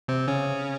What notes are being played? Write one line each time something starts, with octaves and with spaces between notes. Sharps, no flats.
C3 C4
C#3 C#4